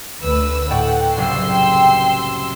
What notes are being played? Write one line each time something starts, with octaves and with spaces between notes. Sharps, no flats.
D2 B4 E6
A2 D5 F#5 G5 C#6
F#1 C2 F#3 C6 E6 C7